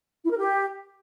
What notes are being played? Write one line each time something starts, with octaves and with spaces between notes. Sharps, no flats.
E4
A#4
G4